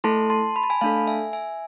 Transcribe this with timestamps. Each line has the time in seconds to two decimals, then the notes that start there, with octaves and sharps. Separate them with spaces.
0.04 A3 E4 A4 A5 C6
0.30 A5 C6
0.56 B5
0.63 A5
0.70 G#5 B5
0.81 A3 D4 A4 F5 A5
1.07 E5 G#5
1.33 E5 G#5